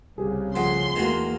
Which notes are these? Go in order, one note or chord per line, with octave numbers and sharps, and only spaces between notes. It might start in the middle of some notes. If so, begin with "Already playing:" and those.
C2 C#3 G4 G#4
F2 A3 G#4 F#5 C6
E2 D#3 E3 A3 A#3 F#4